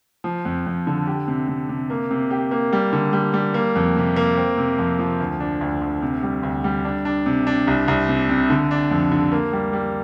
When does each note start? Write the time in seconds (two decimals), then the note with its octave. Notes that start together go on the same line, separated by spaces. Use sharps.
0.24 F3
0.45 F2
0.66 F2
0.87 D3
1.07 G4
1.28 C3
1.48 C3
1.69 C3
1.90 A#3
2.11 C3
2.31 G4
2.51 A#3
2.73 G3
2.93 D3
3.13 G3
3.34 G3
3.54 A#3
3.76 F2
3.96 C3
4.16 A#3
4.37 C4
4.57 C3
4.79 F2
4.99 F3
5.20 D2
5.40 D4
5.61 D2
5.82 D2
6.02 C3
6.23 G3
6.43 D2
6.64 G3
6.85 D4
7.05 D4
7.26 C3
7.47 D4
7.67 C2
7.88 C2
8.09 C3
8.29 C3
8.50 D3
8.71 D4
8.91 F2
9.12 D3
9.32 A#3
9.53 G3
9.73 G3